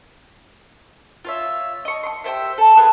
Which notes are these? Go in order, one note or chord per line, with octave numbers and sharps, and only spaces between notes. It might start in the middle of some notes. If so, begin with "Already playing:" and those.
F4 C#5 E5
D#5 C#6
C6 C#6
G4 G#4 C5 E5
A4
F4 G#4 A#4 B4